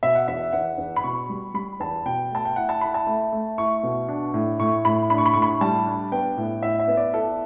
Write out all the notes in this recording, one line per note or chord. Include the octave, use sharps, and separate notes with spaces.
B2 E5
F#5
E2 E5
E2 F#5
E2
B5
B2 C#6
G3
G3 B5
E2 A5
B2 G5
A3 A5
G5
E4 F#5
A5
E4 B5
A5
A3
A3
E4 C#6
B2
D4
A2
A2 C#6
A2 B5
D4 B5
C#6
B5
A2 C#6
B5
G3 A5
D4
B3 G5
A2
E4 E5
E5
B3
D5
E4 A4